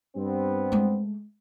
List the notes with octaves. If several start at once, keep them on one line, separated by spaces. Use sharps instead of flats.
G2 B3 C4
G#3 A3